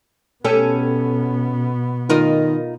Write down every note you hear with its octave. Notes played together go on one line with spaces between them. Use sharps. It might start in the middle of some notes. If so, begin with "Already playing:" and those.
B2 B3 C#4 G4 A4
D#3 D#4 F4 A#4